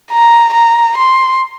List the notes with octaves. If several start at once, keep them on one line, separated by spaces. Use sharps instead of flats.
A#5
A#5
C6